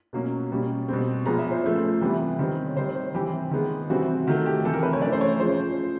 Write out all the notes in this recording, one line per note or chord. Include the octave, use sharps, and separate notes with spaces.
B2 F#3 A#3 C#4
B2 G3 A#3 C#4
B2 G3 C4
A#2 F3 G#3 B3 A#5
E5
C5
C#3 F3 A3
C3 E3 G3 B3
D#3 G3 C4
C#5
D#3 G3 C4 C5
C5
C3 E3 G3 C4 G4
D#3 G#3 B3
C3 E3 G3 C4 F#4
D#3 F#3 A3 F#4
G4
C3 E3 A3 A4
A#4
B4
C#5
E3 A3 C#4 D5
C5
C#5
C#3 F3 G#3 C5